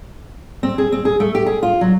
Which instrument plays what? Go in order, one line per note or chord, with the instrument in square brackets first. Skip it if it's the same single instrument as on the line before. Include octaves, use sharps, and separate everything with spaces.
[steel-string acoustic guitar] C4
G#4
C4
G#4
A3
G4
G#4
F4
F#3